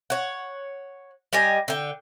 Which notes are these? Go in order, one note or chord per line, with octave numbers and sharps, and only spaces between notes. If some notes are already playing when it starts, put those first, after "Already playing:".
C#5 F#5
G3 G4 D#5 G#5
D3 G5